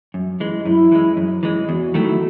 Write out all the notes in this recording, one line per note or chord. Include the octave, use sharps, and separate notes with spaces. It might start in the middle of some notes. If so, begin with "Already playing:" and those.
F#2
E3 G#3
F#2 E4
E3 G#3
F#2
E3 G#3
E2 F#4
D#3 F#3 A3 E4